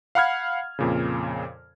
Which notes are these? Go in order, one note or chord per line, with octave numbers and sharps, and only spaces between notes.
F5 F#5 B5 F6 G#6
F2 A#2 C#3